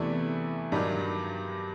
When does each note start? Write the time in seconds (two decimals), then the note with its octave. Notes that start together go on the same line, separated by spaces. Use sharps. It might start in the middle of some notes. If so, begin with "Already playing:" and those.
Already playing: E2 C3 E3 A3 D4 E4
0.72 G2 D#3 F#3 D4